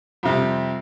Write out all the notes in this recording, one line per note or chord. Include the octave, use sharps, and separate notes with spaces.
F2 C3 G3